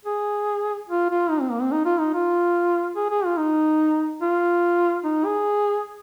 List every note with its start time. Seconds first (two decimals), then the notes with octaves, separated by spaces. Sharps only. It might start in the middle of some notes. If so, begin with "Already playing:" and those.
0.05 G#4
0.89 F4
1.10 F4
1.30 D#4
1.41 C4
1.52 A#3
1.62 C4
1.72 D#4
1.85 F4
2.00 D#4
2.14 F4
2.96 G#4
3.10 G#4
3.25 F4
3.38 D#4
4.22 F4
5.04 D#4
5.25 G#4